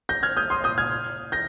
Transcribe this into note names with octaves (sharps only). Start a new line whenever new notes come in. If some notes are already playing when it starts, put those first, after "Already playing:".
G6 A#6
F6 G#6
D#6 G6
C6 D#6
D#6 G6
F6 G#6
G6 A#6